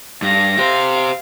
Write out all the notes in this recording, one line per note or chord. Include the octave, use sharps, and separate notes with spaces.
G2 F5 A#6
G4 C5 F5